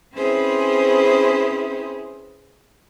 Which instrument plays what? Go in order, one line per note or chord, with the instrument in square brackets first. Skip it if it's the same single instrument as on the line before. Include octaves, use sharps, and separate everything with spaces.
[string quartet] C4 C#4 E4 G#4 B4 C5